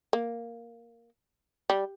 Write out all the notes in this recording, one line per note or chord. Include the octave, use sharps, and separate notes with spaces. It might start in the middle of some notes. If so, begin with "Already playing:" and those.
A#3
G3